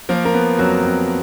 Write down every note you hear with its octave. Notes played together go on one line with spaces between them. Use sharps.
F3 A#3 A#4
A#3 A#4
B3
F2 F#3 F#4
F2